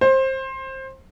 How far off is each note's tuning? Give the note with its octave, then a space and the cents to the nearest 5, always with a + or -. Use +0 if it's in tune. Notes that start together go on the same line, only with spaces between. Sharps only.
C5 +20